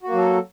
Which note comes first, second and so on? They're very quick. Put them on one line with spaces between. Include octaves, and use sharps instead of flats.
F#4 A#3 F#3 A4